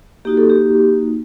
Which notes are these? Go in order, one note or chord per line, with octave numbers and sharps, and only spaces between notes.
A#3 D#4 F#4 G4
A4
G4